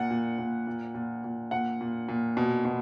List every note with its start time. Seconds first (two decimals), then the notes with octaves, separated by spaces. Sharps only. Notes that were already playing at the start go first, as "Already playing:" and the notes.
Already playing: A#2 F#5
0.11 A#2
0.39 A#2
0.67 A#2
0.95 A#2
1.24 A#2
1.51 A#2 F#5
1.81 A#2
2.08 A#2
2.37 B2
2.65 B2